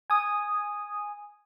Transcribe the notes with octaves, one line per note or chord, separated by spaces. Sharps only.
G#5 D#6